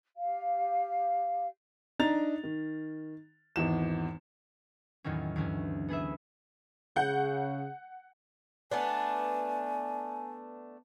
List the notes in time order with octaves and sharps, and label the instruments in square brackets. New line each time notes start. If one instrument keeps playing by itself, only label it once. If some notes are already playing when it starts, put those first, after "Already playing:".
[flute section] G4 F5
[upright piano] D4 D#4 A#5 A6 F7
D#3
G#1 E2 E7
[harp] E2 A2 D#3 F#3 C#4
D2 G2 E3 C#4
B3 G#4 B4 E5
[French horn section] C#3 [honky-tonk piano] F#5 G6
[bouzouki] A3 B3 D4 [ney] G#5